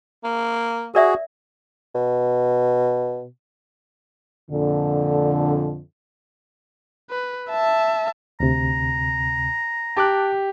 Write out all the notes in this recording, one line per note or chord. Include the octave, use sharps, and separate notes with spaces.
A#3
F#4 G#4 A#4 D5 E5
B2
F2 A#2 D3
B4
E5 A5
D2 C3 A#5
G4 A5 D6 F#6